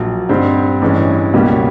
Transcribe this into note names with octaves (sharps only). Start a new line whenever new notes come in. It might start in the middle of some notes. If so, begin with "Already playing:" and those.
Already playing: A#1 A#2 F#3
G2 D3 G3 C4 D#4
A1 G2 E3 G#3 C#4
C#2 B2 G3 A#3 C#4